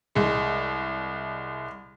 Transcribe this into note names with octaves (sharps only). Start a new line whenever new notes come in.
C2 G#3